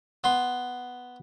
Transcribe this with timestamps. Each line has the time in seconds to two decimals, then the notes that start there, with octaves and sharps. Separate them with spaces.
0.24 B3 C6